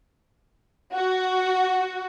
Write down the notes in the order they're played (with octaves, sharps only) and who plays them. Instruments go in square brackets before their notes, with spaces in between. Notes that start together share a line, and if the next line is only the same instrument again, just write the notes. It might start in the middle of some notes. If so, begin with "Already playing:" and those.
[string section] F#4